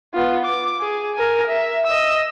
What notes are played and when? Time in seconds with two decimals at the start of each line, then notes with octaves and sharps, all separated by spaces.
0.14 B3 F4
0.44 D6
0.81 G#4
1.15 A#4 G#5
1.46 E5
1.86 D#5 E6